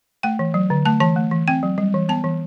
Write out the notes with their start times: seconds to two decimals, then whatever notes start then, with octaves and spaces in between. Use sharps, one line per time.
0.23 A3 G5
0.39 E3
0.54 F#3
0.70 D3
0.85 A3 A5
1.00 E3 A5
1.16 A3
1.31 E3
1.48 C4 G5
1.63 F#3
1.78 G3
1.94 E3
2.09 B3 A5
2.24 E3